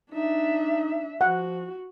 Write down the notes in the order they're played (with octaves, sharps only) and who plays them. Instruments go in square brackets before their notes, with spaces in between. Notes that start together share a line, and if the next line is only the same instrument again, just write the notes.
[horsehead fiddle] D4 E5 [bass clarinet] D#4
[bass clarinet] F3 [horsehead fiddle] F#4 [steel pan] F#5